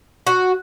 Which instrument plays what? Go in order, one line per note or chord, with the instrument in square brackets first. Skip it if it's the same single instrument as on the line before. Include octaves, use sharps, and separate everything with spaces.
[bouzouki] F#4